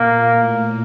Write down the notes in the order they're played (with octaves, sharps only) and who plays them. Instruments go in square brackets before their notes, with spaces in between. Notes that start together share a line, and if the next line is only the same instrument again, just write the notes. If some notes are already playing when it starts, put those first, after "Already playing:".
Already playing: [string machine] A#2 [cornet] A#3
[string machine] A2